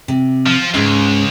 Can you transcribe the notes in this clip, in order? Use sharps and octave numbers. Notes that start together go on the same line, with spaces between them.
C3
F3
C#2 G#2 C#3